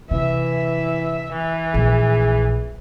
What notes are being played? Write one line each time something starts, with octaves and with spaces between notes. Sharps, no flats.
C3 E3 E5
E3
A#1 G#4